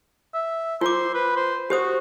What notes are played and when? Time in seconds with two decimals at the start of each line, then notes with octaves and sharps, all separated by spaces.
0.34 E5
0.81 F4 C5 D6
1.14 B4
1.36 C5
1.70 F#4 G4 C5 D#6